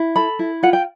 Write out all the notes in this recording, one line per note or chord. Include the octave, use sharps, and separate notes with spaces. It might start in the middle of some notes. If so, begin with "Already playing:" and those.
Already playing: E4
A4 B5
E4
F4 F#5
G5